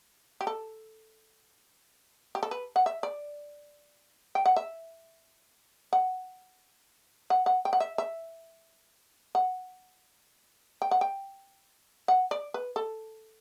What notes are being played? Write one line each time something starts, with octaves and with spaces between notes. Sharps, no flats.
G4
A4
G4
A4
B4
F#5
E5
D5
G5
F#5
E5
F#5
F#5
F#5
G5
F#5
E5
E5
F#5
G5
F#5
G5
F#5
D5
B4
A4